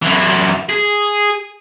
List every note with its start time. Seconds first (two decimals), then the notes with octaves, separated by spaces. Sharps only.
0.02 F#2 E3
0.69 G#4